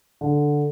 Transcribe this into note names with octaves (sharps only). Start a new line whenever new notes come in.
D3